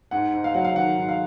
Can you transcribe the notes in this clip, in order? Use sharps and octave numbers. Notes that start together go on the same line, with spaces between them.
G#2 F#5
G#2
F5
F#3 F#5
F5
D#3 F#5
G#2
F5